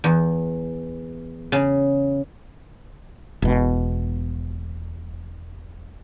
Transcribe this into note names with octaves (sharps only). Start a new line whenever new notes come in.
E2
C#3
E1 B2